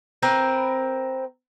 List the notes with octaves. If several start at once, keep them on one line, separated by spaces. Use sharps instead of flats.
C4 A#4 B4